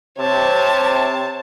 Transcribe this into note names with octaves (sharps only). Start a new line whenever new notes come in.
C3 C#5 A5